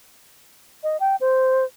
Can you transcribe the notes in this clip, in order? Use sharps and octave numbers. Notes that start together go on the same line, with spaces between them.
D#5
G5
C5